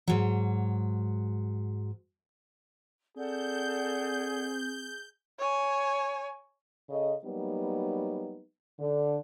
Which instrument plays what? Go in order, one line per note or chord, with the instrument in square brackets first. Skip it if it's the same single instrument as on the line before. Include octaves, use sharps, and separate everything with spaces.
[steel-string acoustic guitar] G#2 F#3
[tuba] C4 [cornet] G#4 [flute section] A4 D5 F#5 [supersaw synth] G6
[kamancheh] C#5 G#5
[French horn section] C#3 A4 D#5
F#3 G3 A#3 B3 D#4
D3